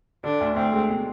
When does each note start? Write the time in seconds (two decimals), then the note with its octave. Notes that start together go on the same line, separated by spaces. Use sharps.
0.24 D3 D4
0.40 D2
0.56 D2 C4
0.73 G#3
0.89 B2